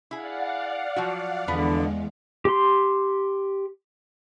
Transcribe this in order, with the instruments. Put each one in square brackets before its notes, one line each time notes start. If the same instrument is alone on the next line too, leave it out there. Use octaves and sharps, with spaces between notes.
[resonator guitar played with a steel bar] E4 G#4 [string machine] D5 F5 F#5
[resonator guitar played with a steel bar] F3 F#3 F#4
[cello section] E2 [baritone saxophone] D3 [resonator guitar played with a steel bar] F3 B3 B4 [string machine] G#3
[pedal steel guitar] G4 C6